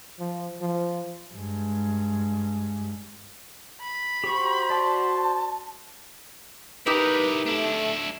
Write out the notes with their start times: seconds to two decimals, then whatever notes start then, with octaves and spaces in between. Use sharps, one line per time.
0.19 F3
0.61 F3
1.34 G2 G#3
3.81 B5
4.24 F#4 G4 C5 C#6
4.70 D5 A5 D6
6.87 D#4 E4 G4 A#4 B4
7.46 A3 D4 E4